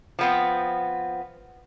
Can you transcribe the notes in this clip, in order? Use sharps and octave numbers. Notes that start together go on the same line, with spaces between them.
F3 B3 C4